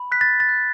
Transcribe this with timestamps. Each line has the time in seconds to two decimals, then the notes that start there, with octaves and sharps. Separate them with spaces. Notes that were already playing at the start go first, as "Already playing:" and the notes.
Already playing: B5
0.12 F#6 B6
0.21 A6
0.40 A6
0.49 F#6